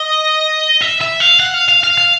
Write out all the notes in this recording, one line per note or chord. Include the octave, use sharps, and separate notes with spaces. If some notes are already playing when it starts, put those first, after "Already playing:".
Already playing: D#5
E5
E5
F5
F#5
F5
F5
F5
F5